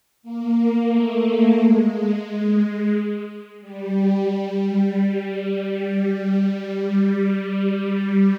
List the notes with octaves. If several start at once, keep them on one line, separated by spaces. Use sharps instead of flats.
A#3
A3
G#3
G3
G3